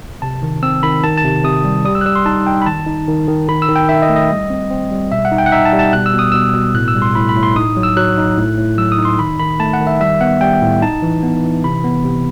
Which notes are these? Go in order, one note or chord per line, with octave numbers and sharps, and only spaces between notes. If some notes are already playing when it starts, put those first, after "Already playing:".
C3 A5
D#3
C4 E6
D#3 B5
D#3 A5
A5
C3
C3 D#6
G3
G3 D#6
E6
F#6
G3 E6
C6
D#4 A5
D#4 G5
B5
D#3 A5
D#4
D#3
D#3
D#3 B5
E6
D#3
G5
D#3 E5
D#5
A3
D#5
G3
C4
C4
G3
B2 E5
F#5
D#4
G5
F#5
D#4 E5
A5
G3
A5
B2 F#6
E6
B2
D#6
B2 E6
B2
A2 F#6
E6
G3
C6
A2 B5
B5
A2
C6
D#4 D#6
F#3
E6
F#3 F#6
D#4
A2
A2
F#3 E6
D#6
D#4
C6
D#3 B5
D#3 B5
A3 A5
F#5
D#3
E5
G3 E5
B3 F#5
G3 G5
A2
D#4 A5
E3
B3
E3
C3 B5
B3
C3